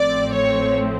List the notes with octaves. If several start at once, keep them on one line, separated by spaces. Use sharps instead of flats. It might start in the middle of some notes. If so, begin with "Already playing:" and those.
Already playing: A1 A2 F3 A3 C4 D5
C#5